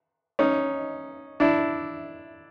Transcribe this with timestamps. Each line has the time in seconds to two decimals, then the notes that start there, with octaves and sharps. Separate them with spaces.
0.39 C#4 D#4
1.40 D4 E4